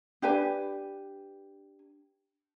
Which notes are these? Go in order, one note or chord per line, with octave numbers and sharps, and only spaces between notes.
D4 G4 B4 G#5